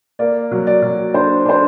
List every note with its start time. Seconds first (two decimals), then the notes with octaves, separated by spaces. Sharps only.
0.19 A#3 D5
0.51 F#3
0.67 D5
0.82 F#3
1.14 D4 C5
1.46 D4 C5